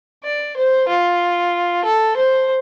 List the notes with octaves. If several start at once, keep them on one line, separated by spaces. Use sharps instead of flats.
D5
C5
F4
A4
C5